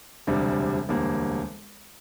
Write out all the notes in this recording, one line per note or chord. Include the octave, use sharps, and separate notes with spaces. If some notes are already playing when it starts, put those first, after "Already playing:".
E1 D2 C3 G3 D4
E1 D2 D3 G3 A#3